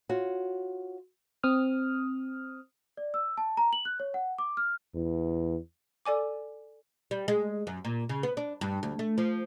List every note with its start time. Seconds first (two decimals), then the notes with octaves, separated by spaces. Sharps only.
0.09 F4 F#4 C#5
1.43 C4 D#6 F6
2.97 D5
3.14 E6
3.37 A5
3.57 A#5
3.73 F#7
3.85 F#6
4.00 C#5
4.14 F#5
4.38 D6
4.57 F6
4.95 E2
6.06 A4 D5 G#5 D6
7.11 G3
7.28 G#3
7.67 F#2
7.85 A#2
8.09 C#3
8.23 B3
8.37 D4
8.61 G2
8.83 D2
8.99 A3
9.18 F3